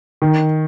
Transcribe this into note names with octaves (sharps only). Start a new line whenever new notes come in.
D#3